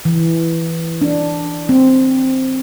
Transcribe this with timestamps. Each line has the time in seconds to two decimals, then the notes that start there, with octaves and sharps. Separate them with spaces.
0.05 E3
1.01 D4
1.69 C4